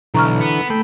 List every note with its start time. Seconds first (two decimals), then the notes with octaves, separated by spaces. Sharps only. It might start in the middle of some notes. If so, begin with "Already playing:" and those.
0.14 B1 D3 E3 A#5 C#6 F6
0.40 B3
0.70 A3 A4 G5 B5